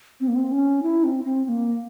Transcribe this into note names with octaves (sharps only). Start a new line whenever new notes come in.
C4
A#3
C4
C#4
E4
C4
C4
C4
A#3